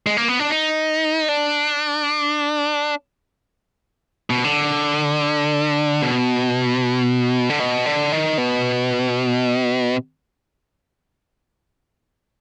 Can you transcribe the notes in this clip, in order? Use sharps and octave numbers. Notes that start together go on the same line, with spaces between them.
G#3
A#3
B3
D4
D#4
D4
B2
D3
B2
D3
B2
D3
D#3
B2